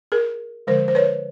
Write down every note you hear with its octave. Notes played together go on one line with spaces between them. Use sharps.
G#4 A#4
D3 F3 G#3 A#4 C5
C5
B4 C#5